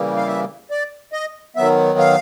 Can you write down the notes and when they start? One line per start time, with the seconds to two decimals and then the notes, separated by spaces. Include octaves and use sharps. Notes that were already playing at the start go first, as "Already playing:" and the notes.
Already playing: C#3 E3 G3 A#3
0.17 F5
0.28 E5
0.71 D5
1.13 D#5
1.56 D#3 F#3 B3 E5
1.99 F5